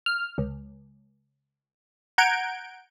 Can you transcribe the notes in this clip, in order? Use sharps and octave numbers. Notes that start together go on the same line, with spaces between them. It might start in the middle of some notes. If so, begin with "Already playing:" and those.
F6
C#2
F#5 A#5 G6 G#6 D7